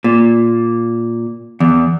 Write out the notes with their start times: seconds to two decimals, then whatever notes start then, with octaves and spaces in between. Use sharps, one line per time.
0.04 A#2
1.60 E2